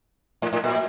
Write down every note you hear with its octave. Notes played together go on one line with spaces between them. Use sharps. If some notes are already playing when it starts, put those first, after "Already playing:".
A2
A2
A#2